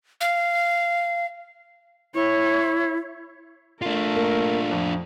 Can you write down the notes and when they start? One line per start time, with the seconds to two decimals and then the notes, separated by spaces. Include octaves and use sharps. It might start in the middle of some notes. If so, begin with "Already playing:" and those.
0.21 F5
2.14 E4 C#5
3.82 A3 D4 F4 A#4
4.16 A#3
4.71 F2